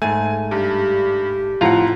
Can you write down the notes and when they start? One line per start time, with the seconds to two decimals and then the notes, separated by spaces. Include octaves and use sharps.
0.02 G#2 A3 G#5
0.51 G2 G4
1.61 F2 A2 F3 F4 F5 F#5 A#5